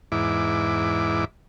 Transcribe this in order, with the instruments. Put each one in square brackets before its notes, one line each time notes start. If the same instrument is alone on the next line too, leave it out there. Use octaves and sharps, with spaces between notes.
[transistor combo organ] E2 G#2 E4 D6